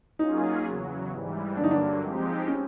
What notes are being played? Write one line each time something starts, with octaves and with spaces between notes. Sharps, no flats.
F#3 A#3 C#4 D#4 F4 G#4
E2 C#3 F#3
G#2 E3 G3
G2 D3 F#3 A#3 D4
D#4
D4
F3 G#3 C4 D#4 G4
C#4